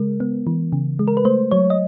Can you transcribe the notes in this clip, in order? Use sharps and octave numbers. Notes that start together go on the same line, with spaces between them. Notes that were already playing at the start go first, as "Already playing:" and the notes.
Already playing: C#3 G#3 A#4
B3
E3
C#3
G#3
A#4
B4
A3 C5
F#3 C#5
D#5